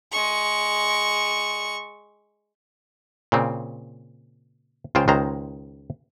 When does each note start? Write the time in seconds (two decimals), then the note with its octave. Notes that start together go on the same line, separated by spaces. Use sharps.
0.12 G#3 C#6
3.32 A#2 C#3 C4
4.95 C#2 C#3 F4 C5 G5
5.08 C#2 D#3 G#3 C5 A#5